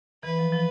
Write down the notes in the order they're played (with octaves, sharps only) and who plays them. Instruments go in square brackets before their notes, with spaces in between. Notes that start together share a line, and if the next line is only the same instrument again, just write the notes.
[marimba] E3 [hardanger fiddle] B4
[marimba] F3
F3